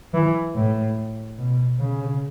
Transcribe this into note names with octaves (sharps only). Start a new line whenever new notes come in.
E3
A2
B2
C#3